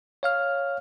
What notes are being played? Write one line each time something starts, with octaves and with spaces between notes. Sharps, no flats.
C#5 F5 F6